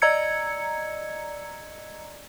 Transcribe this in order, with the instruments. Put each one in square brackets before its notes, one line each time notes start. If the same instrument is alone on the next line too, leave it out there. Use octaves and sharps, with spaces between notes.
[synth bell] D5 D#5 A#5 E6 G#6 C#7